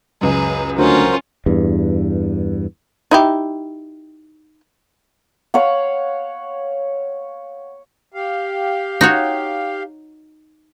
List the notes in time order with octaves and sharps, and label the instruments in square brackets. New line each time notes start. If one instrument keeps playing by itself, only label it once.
[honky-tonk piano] C#2 F#2 [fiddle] G#4 B4
[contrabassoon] D2 [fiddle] C#4 F4 [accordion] F#4 A#4 C5
[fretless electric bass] E2 G2
[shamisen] D#4 E4 G4
[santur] C#5 F5 F#5
[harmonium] G4 F5
[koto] D#4 F#4 C#5